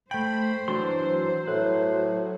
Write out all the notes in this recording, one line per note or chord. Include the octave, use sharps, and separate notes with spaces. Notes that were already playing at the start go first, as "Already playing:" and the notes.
A3 C5 G5 B5
E3 F#3 D4 C6
A2 B4